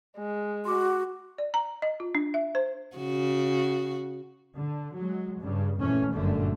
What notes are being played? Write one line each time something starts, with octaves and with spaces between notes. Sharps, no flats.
G#3
F#4 C6 D6
D5
A#5
D#5
F4
D4
E5
C5
C#3 F#4
D3
F#3 G#3
G2 C#3
F2 A#2 E3 A3 C#4
G1 F#2 A#2 D3 A3